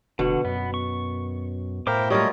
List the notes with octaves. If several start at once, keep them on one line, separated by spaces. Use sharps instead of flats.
F1 B2 D3 F#4
F#2 B3
C#6
A2 E4 A#4 C5 F5 G5 D6
F#3 G3 A3 A#3 F4 C#5 D#5